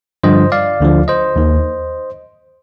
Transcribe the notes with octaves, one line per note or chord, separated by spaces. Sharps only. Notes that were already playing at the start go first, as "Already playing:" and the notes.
G2 D3 F3 C5 D#5
D5 F5
D2 D3 F3
C5 D#5
D#2 D#3